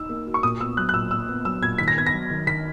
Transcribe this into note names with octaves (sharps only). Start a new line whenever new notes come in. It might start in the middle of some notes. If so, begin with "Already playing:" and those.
Already playing: D#4 E6
A#3
F#4
C#6
A#2 D#6
B3 E6
F#3 F#6
F#6
A#2 E6
A#2 E6
B3
F#3 E6
A#2 G#6
D#3 B6
A#6
B3 G#6
A#6
F#3
D#3
D#3 B6